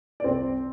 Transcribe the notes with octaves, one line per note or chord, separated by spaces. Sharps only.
D5
C2 C4 C5